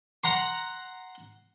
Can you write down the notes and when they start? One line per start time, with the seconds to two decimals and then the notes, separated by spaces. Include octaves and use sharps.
0.24 F#5 A#5 C6